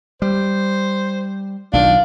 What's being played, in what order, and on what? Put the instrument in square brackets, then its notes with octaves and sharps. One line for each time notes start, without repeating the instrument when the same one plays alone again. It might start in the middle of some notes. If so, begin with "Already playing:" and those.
[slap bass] G3 [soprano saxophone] C5
[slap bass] B1 D#3 [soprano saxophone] D4 [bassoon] F4